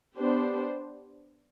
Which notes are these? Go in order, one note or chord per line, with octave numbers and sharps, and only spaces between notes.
B3 D4 G4 C5